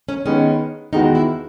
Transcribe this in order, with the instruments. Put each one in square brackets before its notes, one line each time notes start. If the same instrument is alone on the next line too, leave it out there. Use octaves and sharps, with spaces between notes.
[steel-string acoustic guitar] C#4
[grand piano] D#3 G#3 B3 D#4 [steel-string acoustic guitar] C#4
[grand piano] E2 D#3 G#3 B3 F#4 [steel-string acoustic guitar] D#4
[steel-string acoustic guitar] E4